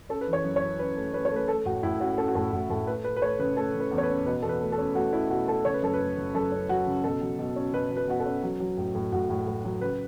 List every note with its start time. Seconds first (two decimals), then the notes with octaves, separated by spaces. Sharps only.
0.09 C#4 A4
0.21 B4
0.27 E3
0.33 C#5
0.44 F#2
0.56 C#5
0.61 C#4
0.79 C#4 B4
0.97 A3
1.14 C#4 B4
1.25 C#5
1.31 A3
1.36 B4
1.48 A3 A4
1.65 A2 F#4
1.83 A2 E4
2.00 C#4 F#4
2.18 C#4 A4
2.28 F#4
2.35 A2 A4
2.52 A2 F#4
2.70 A2 A4
2.87 A3 B4
3.04 A3 B4
3.16 B4
3.22 A3 C#5
3.39 C#3 B4
3.57 A3 A4
3.74 C#3
3.80 B4
3.91 E2
3.98 C#5
4.03 B4
4.09 C#4
4.26 B2 B4
4.42 E2 A4
4.49 B4
4.61 A3
4.72 A4
4.78 C#4
4.95 A3 F#4
5.13 C#4 E4
5.30 B2 F#4
5.48 A3 A4
5.65 C#3 C#5
5.74 B4
5.82 F#2 A4
5.94 B4
6.00 A3
6.17 C#3
6.34 F#2 A4
6.52 C#4
6.69 F#2 F#4
6.87 C#3
7.04 B2 A4
7.21 F#3
7.39 B2
7.56 C#4
7.73 B2 B4
7.91 B2
7.96 B4
8.08 B2 F#4
8.20 A4
8.26 C#4
8.43 F#3
8.60 F#3
8.77 A2
8.95 A2
9.12 A2 F#4
9.30 A2
9.47 A2
9.65 F#3
9.81 C#3 B4